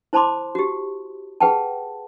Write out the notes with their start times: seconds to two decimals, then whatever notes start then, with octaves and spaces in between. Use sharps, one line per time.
0.13 E4 C5 A5 B5 C6 D6
0.55 F#4 G4
1.40 G#4 B4 F#5 G5 A5